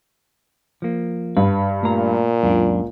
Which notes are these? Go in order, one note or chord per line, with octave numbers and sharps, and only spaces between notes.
F3 A#3
G2 B4
A#2 A3 A#5
C#2 F#2 D4